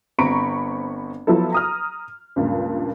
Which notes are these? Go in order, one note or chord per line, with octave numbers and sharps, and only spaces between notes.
G1 C4 A#5 B5 C#6 D7
F3 F#3 B3 E4 A4
A#5 D#6 F6
C#2 G2 A#2